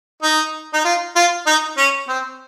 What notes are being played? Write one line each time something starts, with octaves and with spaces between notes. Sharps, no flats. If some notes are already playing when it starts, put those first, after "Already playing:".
D#4
D#4
F4
F4
D#4
C#4
C4